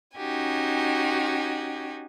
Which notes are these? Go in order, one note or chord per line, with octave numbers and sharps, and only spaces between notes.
C#4 D#4 F#4 G4 G#5